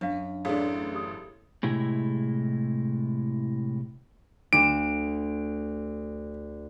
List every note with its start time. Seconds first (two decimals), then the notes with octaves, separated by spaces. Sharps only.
0.01 F#2 D4 F5
0.45 A1 D4 G#4 A4 F5
0.94 G4 D#6
1.63 A2 C3 G#3 E4
4.53 D2 D7 E7